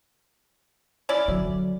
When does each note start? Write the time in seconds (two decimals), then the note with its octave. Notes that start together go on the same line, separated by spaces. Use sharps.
1.09 C#4 E4 D5
1.28 D3 F#3